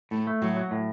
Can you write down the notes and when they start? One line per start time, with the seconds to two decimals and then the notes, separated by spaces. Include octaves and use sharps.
0.11 A2 A3
0.27 A3
0.42 A2 F#3
0.57 F#3
0.71 A2